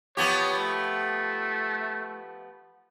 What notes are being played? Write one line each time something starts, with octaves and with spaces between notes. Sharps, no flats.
F3 B3 G4 C#5
A3